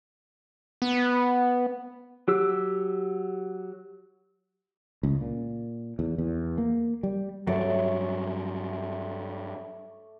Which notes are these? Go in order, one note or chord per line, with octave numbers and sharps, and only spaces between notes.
B3
F#3 G4 E6
C#2
A#2
E2
E2
A#3
G3
G2 F#3 A3 C#5 D5